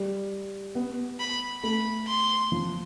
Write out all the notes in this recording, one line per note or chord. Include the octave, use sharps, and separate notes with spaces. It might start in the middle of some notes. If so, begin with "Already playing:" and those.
Already playing: G3
B3
B5
A3 B5
C6
F3